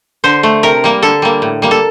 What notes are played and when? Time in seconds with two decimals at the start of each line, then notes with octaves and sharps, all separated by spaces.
0.24 D3 C5
0.43 A3
0.63 C3 A#4
0.84 G3 A#3
1.03 D3 A4
1.22 G3 A#3
1.42 A2
1.62 G3 A#3
1.71 A4